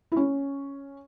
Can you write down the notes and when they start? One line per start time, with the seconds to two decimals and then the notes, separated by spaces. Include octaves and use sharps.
0.12 E4
0.17 C#4